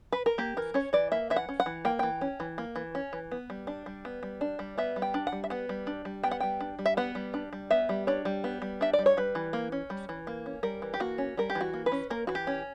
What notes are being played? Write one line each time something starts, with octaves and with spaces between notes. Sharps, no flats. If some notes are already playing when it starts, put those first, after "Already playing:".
B4
A#4
A#3 G4
E3 A#4
C#4 C#5
E3 D5
A#3 E5
E3 E5
F#5
C#4
F#5
E3
A#3 G5
E3 G5
C#4
E3
A#3
E3
C#4
E3
B3
G3
D4
G3
B3
G3
D4
G3
B3 E5
G3
G5
D4
F#5
G3
E5
B3 F#5
G3
D4
G3
B3 G5
F#5
G3 G5
D4
G3
E5
B3 F#5
G3
D4
G3
B3 E5
G3
D4 C#5
G3
B3
G3
D4 E5
D5
G3
C#5
G3 B4
E3
A#3
C#4
G3
E3
A#3
C#4
G3 A#4
E3
G4
A#3 F#4
C#4
G3 A#4
G4
E3
F#4
A#3
B4
C#4
A#3 A#4
E3 F#4
G4
C#4